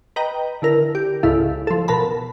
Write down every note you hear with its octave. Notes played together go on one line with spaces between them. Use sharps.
B4 D#5 G5 A#5
D3 E4 A#4
G4
C#2 G#2 C#3 E4 A4 F5
F3 A4
B2 A#4 A5 B5